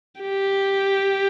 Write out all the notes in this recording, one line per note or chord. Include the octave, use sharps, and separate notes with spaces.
G4